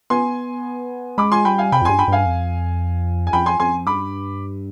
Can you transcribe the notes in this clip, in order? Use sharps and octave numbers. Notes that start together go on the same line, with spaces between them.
B3 G#5 C6
G#3 B5 D6
G#5 C6
G3 G5 B5
F5 G#5
C3 G5 B5
F2
G2 G#5 C6
G5 B5
G2 F5 G#5
F2
G#5
F2 G5 B5
G#5 C6
F2 G#5 C6
G2 B5 D6